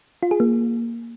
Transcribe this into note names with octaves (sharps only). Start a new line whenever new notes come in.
F4
G#4
A#3